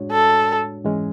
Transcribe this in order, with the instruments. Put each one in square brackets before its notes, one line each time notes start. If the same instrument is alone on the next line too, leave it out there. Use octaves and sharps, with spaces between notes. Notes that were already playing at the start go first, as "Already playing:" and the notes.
Already playing: [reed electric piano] A2 G#3 D4 F#4 C#5
[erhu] A4
[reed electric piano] G#2 E3 G#3 C#4